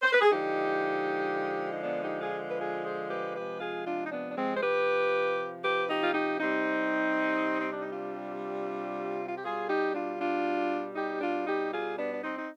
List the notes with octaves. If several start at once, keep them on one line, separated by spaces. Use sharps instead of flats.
C5
B4
G#4
D3 F3 G#3 D#4 G4
D#4
B3 D4
D#4 G4
F4 G#4
B4
F4 G#4
G#4 C5
G4 B4
C3 F3 G#3 G4 B4
F4 G#4
D4 F4
D#4
B3 D4
D4
G#3 C4
C5
G4 B4
G4 B4
D#4 G4
F4
D#4 G4
C3 G3 C4 D#4
C4
D4
D#4
D4 F4
F4
G4
B2 G3 F4 G#4
D#4 G4
D4 F4
D4 F4
D#4 G4
D4 F4
D#4 G4
F4 G#4
B3 D4
D4
C4 D#4
D#4